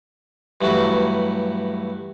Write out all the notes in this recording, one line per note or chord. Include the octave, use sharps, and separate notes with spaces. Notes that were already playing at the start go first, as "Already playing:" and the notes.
G2 E3 F#3 A3 F#4